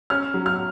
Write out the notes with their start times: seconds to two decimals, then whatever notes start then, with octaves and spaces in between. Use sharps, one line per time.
0.10 C#4 F6
0.34 F#3
0.46 F6